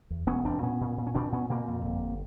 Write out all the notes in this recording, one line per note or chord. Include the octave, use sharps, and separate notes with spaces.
E2
E1 B3 C#4
E1 C4 D4
A#2 B3 C#4
A#2
A#2
C#4
A#2 C4 D4
A#2 B3 C#4
A#2 A#3 C4
F2
G1